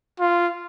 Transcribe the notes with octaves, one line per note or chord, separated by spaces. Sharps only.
F4